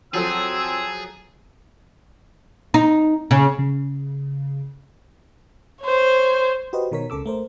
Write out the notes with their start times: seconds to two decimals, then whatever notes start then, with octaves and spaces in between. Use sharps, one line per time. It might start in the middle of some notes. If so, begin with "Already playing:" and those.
0.14 F3 F#3 C4 G#4 A4 E6
2.74 D#4
3.31 C#3
3.59 C#3
5.82 C5 C#5
6.73 F#4 G4 B4 C5 D#5
6.92 B2 D#3 A#4 C#5 B6
7.10 C#2 C#3 A4 D6 E6
7.26 A3 A#4 C5